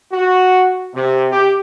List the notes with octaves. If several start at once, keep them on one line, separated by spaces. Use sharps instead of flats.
F#4
C3
G4